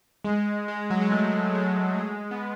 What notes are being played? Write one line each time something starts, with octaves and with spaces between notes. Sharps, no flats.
G#3
G#3
F#3
G#3
A3
G#3
G#3
B3